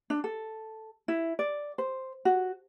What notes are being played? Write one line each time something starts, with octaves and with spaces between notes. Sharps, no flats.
D4
A4
E4
D5
C5
F#4